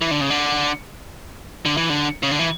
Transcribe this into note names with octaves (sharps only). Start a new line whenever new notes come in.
E3
D3
C#3
D3
D3
E3
D3
C#3
D3
E3